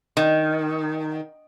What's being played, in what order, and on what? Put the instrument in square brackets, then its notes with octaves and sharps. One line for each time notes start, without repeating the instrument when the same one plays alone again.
[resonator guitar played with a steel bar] D#3